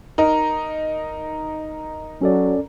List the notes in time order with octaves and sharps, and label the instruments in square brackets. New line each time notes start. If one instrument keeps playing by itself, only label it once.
[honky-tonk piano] D#4 [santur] A#4
[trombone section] F#3 [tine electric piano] C#4 A4 D5